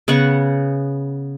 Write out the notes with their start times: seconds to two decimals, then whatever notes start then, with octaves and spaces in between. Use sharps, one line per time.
0.08 C#3 B3 F#5 C#6